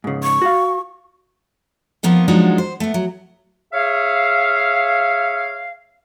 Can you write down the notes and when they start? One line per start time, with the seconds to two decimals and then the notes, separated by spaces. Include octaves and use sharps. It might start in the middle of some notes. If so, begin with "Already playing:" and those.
0.04 G#2 C#3
0.23 C#6
0.42 F#4 F5
2.03 F3 A#3 B3 D#4
2.28 F3 F#3 G#3 D4 D#4 F#4
2.58 C5
2.80 A3 B3
2.94 F#3
3.72 G#4 C#5 E5 F5